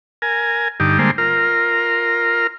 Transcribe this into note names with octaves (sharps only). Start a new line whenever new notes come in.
A#4 G#5
G2 D3 D#4 G4
D3 G3 G#3 A#3 C5
F4 A#4